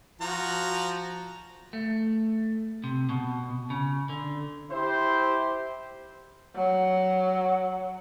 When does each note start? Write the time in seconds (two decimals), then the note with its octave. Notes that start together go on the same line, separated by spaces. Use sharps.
0.21 F3 F#4 A#5
1.73 A3
2.84 C3
3.09 B2
3.70 C#3
4.09 D3
4.71 E4 G4 C5
6.55 F#3